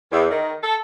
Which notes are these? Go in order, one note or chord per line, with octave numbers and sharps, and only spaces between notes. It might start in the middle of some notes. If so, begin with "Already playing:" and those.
E2
D#3
A4